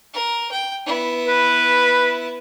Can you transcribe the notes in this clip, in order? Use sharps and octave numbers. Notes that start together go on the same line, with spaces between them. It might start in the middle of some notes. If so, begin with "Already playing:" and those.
A#4
G5
B3 E4
B4